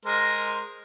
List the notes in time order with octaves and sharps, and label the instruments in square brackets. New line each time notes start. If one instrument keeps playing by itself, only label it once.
[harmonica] G#3 A#4 C5